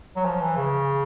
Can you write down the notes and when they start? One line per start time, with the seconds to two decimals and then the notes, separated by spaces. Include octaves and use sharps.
0.16 F#3
0.25 F3
0.41 E3
0.57 C#3